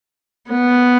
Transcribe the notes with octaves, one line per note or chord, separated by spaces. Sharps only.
B3